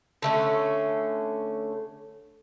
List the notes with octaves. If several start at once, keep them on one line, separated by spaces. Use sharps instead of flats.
D3 A3 C#4